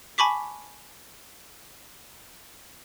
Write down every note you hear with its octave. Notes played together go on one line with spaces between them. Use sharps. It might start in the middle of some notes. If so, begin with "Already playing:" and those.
G#5 A5 B5 C#6 D6 B6